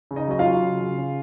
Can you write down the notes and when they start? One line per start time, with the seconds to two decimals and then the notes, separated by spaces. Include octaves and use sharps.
0.11 C#3
0.16 D#4 D#5
0.28 F#3 D#5
0.39 F4 F5
0.46 F#3
0.62 C#3
0.81 C#3
0.98 C#3